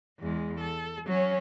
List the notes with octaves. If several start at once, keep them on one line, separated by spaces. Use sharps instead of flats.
E2 G#3
A4
F#3 C#4